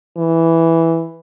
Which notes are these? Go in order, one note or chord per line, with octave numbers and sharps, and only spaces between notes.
E3